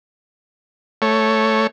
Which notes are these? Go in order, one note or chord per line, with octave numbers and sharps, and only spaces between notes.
A3 C#5